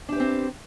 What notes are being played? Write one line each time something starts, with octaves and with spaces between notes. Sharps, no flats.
C4 D4 G4 B4